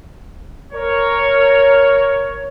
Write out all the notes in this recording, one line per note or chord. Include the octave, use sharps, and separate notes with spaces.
A#4 C#5